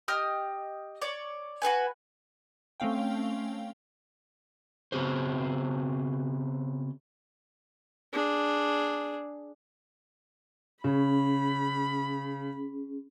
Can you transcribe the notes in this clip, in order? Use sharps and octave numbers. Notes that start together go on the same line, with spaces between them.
G4 D#5 D#6 F6
C#5 D5
F#4 G#4 B4 G#5
A3 C4 C#4 F5 G5
C#3 B3 C4 F#4 G#4 C5
D4 G#4
C#3 C#4 G#4 B5